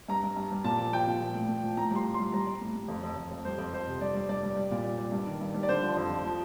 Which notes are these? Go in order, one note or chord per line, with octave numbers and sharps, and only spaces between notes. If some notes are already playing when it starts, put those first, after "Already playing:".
G2 A#5
G2
G2
G3
A#2 A5
F3
F3 G5
A#2
F3
A2
A2
F3
A2 A#5
G3 C6
A2
G3 C6
G3 A#5
G3
A2
A2
F2
F2
F2
F2
G3 C5
F2
F2 C5
C3
G2 D5
G3
G2 D5
G3
G3
A#2
G3
G3
G2
D#3
G2
G3
D5
D3 C5
F3
F2
F3
F3